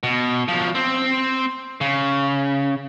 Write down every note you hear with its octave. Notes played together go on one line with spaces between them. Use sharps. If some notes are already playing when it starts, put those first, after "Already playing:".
B2
F3 F#3
C4
C#3